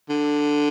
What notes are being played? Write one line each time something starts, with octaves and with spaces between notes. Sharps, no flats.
D3